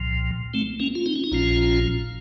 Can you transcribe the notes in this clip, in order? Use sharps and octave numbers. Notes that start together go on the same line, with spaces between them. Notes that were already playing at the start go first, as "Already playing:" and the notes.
Already playing: C2 A#2 F3
A3 C4
A#3 C#4
F4
C4 D#4
C#4
D#4
A#1 A#2 F3 C#4 F4